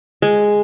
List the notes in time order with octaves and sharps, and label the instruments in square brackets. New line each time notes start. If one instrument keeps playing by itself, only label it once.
[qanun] G#3